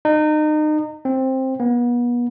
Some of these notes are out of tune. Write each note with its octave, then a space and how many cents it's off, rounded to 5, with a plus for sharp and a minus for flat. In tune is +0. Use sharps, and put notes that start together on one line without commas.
D#4 -30
C4 +10
B3 -35